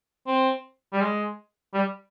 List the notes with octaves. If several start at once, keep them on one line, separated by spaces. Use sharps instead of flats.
C4
G3
G#3
G3